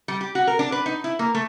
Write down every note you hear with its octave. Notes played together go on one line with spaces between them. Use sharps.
G3
G4
F#4
A#4
D4
B4
D#4
E4
A#3
A3